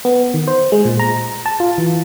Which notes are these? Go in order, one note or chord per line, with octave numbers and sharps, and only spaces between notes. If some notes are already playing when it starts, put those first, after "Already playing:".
B3
D#3
C5
G#3
A#2
A#5
A5
F4
E3